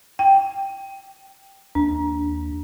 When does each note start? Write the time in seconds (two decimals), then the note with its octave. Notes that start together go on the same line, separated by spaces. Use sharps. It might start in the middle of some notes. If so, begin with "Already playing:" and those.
0.19 G5
1.75 D#2 D4